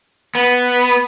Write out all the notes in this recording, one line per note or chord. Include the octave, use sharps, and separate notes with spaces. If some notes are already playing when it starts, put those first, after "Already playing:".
B3